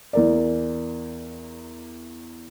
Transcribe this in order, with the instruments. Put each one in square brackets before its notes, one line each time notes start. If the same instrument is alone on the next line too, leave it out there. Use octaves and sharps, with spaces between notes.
[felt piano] E2 A#4 D5